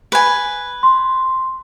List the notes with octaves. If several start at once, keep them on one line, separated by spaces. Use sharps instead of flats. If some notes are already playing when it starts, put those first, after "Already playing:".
B4 G#5
C6